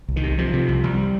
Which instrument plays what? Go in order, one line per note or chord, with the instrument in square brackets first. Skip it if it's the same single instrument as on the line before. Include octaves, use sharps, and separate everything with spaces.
[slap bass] C2
D#3
C3
C3 F3
C3
C2
C2 G3